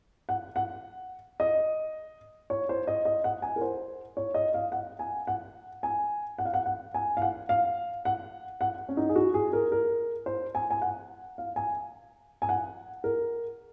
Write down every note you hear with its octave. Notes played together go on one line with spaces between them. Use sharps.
F#5
F#5
D#5
C#5
C5
D#5
D#5
F#5
G#5
A#4
C5
C#5
D#5
F5
F#5
G#5
F#5
G#5
F#5
F5
F#5
F#5
G#5
F5
F#5
F5
F#5
F#5
C#4
D#4
G#4
F#4
G#4
A#4
A#4
C5
G#5
G#5
F#5
F5
G#5
G#5
F#5
A#4